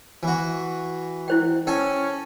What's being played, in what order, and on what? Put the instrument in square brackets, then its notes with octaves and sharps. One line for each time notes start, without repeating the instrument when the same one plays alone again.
[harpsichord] E3 F#4
[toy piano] E4 C5 G5
[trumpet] C#4 [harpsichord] A4 G#5 [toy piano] G5